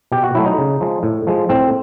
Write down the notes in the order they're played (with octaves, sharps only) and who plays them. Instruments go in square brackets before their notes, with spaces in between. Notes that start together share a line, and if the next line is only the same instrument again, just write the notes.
[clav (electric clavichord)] B2 G4
F#4
F#3 A3 E4
D#4
C#3
F3 G#3
A2
F3 G#3
A2 C4